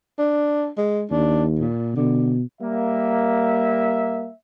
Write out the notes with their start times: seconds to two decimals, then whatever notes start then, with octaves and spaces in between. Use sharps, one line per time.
0.19 D4
0.78 G#3
1.11 D#2 D4
1.59 A#2
1.96 B2 D3
2.61 G3 A#3 E5